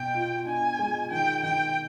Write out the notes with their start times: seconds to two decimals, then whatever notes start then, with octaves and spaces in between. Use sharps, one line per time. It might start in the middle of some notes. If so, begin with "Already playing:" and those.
Already playing: B2 G5
0.14 F4
0.46 D4 G#5
0.79 G#3
1.11 D#3 G5
1.43 D#3 G5